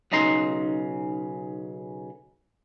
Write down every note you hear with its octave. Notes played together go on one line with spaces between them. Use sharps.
B1 C#3 D#4 A#5 C6